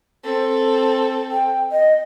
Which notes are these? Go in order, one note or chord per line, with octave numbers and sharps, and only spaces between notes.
C4 A4
G5
D#5